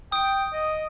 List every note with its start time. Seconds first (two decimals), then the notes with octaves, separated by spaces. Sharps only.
0.12 G5 D#6 D7
0.53 D#5